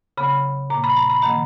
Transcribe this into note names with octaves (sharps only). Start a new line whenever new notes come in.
C#3 F#3 B3 B5
A#2 A#3 A#5
B5
A#5
B5
D#3 F#3 A#3 A#5